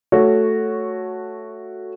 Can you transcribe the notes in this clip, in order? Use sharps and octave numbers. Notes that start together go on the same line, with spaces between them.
A3 F#4 C#5